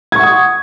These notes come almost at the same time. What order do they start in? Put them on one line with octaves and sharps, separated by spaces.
G#6 C#6 F#5 D#6